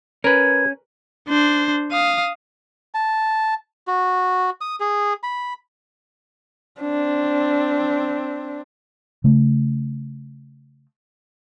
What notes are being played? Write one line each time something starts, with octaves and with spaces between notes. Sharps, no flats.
C#4 A#4 B4 G#6
D4 C5
F5 D#6
A5
F#4
D#6
G#4
B5
C4 D4
C#3 A3